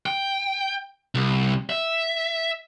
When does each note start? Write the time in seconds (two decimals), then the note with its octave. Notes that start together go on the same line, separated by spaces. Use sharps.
0.06 G5
1.15 C2
1.70 E5